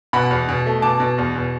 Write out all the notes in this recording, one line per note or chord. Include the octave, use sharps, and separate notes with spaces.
B2 F#5 B5
E2
B2
A3
B2 A5 D6
B2
E2
B2